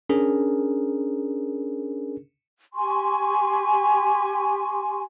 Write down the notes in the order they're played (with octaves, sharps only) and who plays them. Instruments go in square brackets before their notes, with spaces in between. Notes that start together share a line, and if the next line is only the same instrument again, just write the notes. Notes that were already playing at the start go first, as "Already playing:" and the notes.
[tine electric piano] C#4 D4 G#4 A#4
[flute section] G4 G#5 C6 C#6